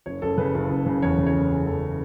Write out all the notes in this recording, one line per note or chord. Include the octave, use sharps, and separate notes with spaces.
F#1 C#5
F#1 A4
C#3 B4
F#1
F#1
C#3
E2 C#5
C#3
C#5
F#1
F#1 G#4
E2 A4